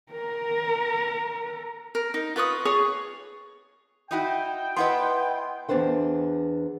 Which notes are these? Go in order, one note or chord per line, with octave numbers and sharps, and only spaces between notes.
A#4 A#5
A#4
D#4
F4 B4 C#6 D#6
G#4 C#5 C#6
D#4 E4 F#4 G5
B3 E4 B4 D#5 F#5 C6
E2 G2 D4 B4 C5 G5